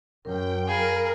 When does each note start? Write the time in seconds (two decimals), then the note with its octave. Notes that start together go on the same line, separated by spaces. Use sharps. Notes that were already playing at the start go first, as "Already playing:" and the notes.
0.25 F#2 A#4 G5
0.68 G#4 A#4 F5 B5